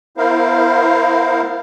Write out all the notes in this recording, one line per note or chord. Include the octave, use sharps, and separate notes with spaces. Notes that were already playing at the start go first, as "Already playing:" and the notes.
B3 E4 A#4 C5 F5